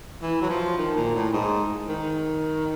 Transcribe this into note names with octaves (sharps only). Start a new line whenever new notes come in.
E3
F#3
F3
D#3
A#2
A2
G#2
D#3